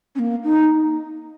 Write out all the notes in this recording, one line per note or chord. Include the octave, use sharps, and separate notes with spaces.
C#4
A#3
D#4